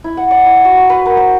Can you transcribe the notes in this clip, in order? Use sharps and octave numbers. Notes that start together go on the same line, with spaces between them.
E4
F#5
D5
E4
F#4
A#5
B4
A#4
C5